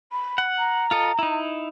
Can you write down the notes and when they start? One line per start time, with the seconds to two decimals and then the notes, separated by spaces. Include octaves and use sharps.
0.12 B5
0.38 F#5
0.58 A#5
0.91 F4 A4 D#5
1.19 D#4 E4